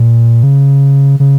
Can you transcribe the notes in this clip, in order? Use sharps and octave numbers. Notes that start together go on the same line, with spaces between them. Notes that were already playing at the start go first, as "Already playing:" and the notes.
Already playing: A#2
C#3
C#3